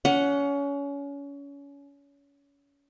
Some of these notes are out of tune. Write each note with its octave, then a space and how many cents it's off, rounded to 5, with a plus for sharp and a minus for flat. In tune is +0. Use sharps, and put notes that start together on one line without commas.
C#4 +30 F#5 +0